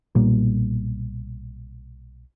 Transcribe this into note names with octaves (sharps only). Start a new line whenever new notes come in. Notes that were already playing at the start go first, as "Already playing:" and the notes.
B1 A#2 G3 A#3